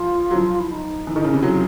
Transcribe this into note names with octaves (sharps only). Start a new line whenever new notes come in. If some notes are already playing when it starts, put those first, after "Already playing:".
Already playing: F3 F4
F#3
F3
E4
D#4
E3
D#3 D4
C#3 D#4
C3 E4
F#3 F4